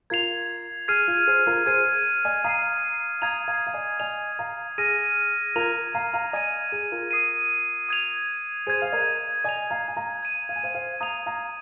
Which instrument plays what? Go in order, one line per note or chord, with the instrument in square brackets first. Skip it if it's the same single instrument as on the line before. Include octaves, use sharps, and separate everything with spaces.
[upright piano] F4 A#4 [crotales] G#6 C7 F7
[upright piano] G#4 [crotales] F6 G#6 C7 D#7
[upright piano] F4
G#4 C5
F4 A#4
[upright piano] G#4 C5 [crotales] G#6 D#7
[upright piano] D#5 G#5
[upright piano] F5 A#5 [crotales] D#6 C7 D#7
[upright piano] F5 A#5 [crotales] D#6 G#6 F7
[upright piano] F5 A#5
F5
D#5 G#5
[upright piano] D#5 G#5 [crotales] G#6 F7
[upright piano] F5 A#5
[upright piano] G#4 [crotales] F6 A#6 D#7
[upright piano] F4 A#4 [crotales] G#6 F7
[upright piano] F5 A#5
F5 A#5
[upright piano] D#5 G#5 [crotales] G#6 D#7
[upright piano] G#4
F4 A#4
[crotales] D#6 C7 D#7
D#6 G#6 F7
[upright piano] G#4 C5 [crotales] G#6 D#7
[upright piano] F5
A#4 D#5
[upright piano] D#5 G#5 [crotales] G#6 F7
[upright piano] F5 A#5
G#5
F5 A#5
[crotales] G#6 D#7
[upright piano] F5
G#5
C5 F5
C5 F5
[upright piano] F5 A#5 [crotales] D#6 G#6 F7
[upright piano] F5 A#5